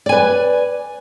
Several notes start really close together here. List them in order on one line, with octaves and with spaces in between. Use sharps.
D5 G#5 B4